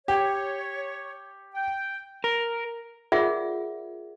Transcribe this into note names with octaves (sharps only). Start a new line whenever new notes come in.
G4 C#5
G5
A#4
F4 G#4 A#4 D5 E5 F#5